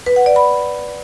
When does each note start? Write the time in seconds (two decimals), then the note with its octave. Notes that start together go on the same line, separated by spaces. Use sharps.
0.06 B4
0.16 F#5
0.26 D5
0.36 B5